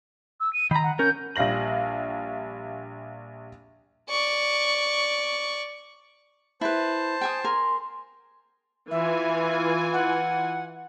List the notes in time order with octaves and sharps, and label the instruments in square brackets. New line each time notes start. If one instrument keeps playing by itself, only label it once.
[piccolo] E6
D#7
[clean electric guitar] D#3 A#5 [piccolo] B5
[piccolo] F#5
[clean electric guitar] C#4 A#4 [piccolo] G6
[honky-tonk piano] A#1 G3 F5 A#6 F#7
[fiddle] D5 C#6
[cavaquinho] E4 B4 [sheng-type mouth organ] C5 A5
[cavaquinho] G5 G#5 D#6
[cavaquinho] A#4 G#5 [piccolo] C6
[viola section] E3 F4 G#5 [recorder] E5
[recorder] F#5